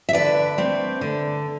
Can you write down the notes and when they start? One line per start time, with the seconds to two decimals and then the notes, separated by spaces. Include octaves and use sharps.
0.09 E5
0.13 D3 B4 D5
0.58 A3 C4
1.01 D3